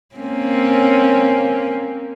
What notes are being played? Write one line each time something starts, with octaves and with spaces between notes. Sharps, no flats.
A#3 C4 C#4